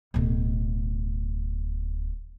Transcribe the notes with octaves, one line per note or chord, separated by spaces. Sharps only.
D1 B2